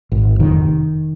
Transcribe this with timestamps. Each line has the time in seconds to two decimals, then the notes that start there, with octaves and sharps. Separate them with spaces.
0.12 G#1
0.40 F1 D#3